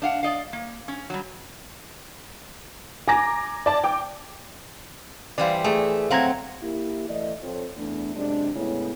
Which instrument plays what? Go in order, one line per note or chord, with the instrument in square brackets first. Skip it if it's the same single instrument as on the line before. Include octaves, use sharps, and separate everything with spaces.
[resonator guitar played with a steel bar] D4 F5 F#5
D5 D#5 F5
A#3
C#4
F#3 G3
[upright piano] G#5 [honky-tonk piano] A#5 D6 A#6
[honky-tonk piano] D5 A5
G5 D6
[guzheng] E3 G3 C5 [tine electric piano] D5 F5
[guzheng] A3 [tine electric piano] G#4 D5
[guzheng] F#3 C4 [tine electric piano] F5 A#5 G#6
[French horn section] A#3 E4 G4
E3 A3 D5 D#5
F2 C4 F4 A4 C#5
E2 A3 D4
F#2 C3 G#3 D4
A2 C#3 G#3 B3 E4